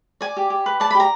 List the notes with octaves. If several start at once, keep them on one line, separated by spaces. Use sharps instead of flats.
D5 G#5
G4
G4
B4
D5 A5
B5
G4
A#5